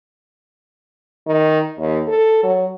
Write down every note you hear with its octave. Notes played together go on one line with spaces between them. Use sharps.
D#3
D#2
A4
F#3